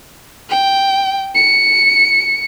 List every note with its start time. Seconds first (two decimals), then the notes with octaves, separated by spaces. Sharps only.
0.50 G5
1.35 C#7